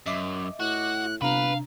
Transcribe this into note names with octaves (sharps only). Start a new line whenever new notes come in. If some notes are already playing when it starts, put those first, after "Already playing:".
F#2 D#5 E5 D6
A2 F#4 F#6
G1 C3 D4 B4 F5 A#5